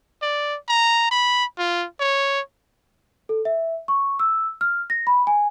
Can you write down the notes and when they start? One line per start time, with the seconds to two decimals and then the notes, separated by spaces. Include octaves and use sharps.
0.22 D5
0.69 A#5
1.11 B5
1.58 F4
2.00 C#5
3.29 A4
3.45 E5
3.88 C#6
4.19 E6
4.61 F6
4.90 A#6
5.07 B5
5.27 G#5